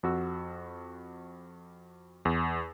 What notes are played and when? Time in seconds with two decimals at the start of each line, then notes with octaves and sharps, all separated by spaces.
0.03 F2 F#4 E6
2.25 E2